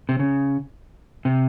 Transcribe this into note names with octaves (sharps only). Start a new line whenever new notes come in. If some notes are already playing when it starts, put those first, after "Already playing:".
C3
C#3
C3